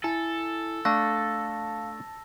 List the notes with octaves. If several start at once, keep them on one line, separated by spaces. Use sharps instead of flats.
E4 A4 G#5
A3 D4 F5 A5 E6 A#6